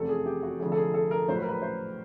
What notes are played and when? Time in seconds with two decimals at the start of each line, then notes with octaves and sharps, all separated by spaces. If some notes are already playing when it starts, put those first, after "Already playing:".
Already playing: F1 E2 C3 A4
0.09 G#4
0.26 G4
0.43 F#4
0.59 F1 F2 D3 G#4
0.72 A4
0.77 G#4
0.94 A4
1.11 A#4
1.28 A#1 A2 F#3 C5
1.35 B4
1.42 A#4
1.49 B4
1.62 C5